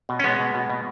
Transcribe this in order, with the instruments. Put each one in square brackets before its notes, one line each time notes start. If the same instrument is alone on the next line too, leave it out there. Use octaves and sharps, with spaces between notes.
[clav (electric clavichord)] B2
C#4
B2 G#3 B3
B2
B2
B2